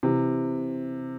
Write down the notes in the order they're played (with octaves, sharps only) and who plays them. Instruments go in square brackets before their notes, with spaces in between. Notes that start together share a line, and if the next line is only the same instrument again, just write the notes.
[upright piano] C3 E3